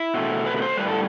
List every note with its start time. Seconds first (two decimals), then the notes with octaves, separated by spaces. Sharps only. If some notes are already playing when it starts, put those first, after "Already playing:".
Already playing: E4
0.14 B2 A3
0.46 B4
0.57 B4
0.62 C5
0.77 A2 G3 B4
0.88 A4